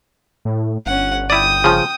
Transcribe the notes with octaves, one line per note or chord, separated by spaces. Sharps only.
A2
G1 C#4 F#5
E4 D5 G5 D#6
C#3 F3